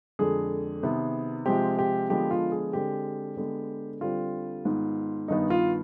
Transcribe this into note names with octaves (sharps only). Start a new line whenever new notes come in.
F2 D3 G#3 G#4
C3 D#3 B3
C3 F3 G#3 C4 G4
G4
D3 F3 G#3 B3 G4
F4
G#4
D3 G#3 C4 G4
D3 G#3 B3
D3 G3 C4 F4
G#2 D#3 B3
G2 D#3 B3 D#4
F4